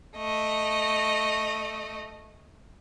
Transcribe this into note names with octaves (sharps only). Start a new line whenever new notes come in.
A3 D#5